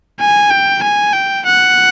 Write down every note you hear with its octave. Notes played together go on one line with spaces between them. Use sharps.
G#5
G5
G#5
G5
F#5